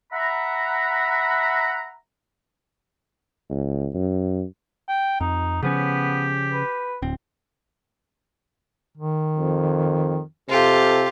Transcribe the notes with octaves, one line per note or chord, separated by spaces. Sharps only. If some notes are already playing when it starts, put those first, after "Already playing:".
E5 F#5 A#5 B5
C#2
F#2
G5
F2 D#4
C#3 F3 B3 C#4 G4
B4
D1 C4
D#3
F2
C3 F4 G4 A4